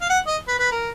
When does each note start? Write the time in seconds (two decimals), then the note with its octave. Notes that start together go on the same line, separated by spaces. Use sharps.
0.01 F5
0.09 F#5
0.27 D#5
0.48 B4
0.59 B4
0.71 A#4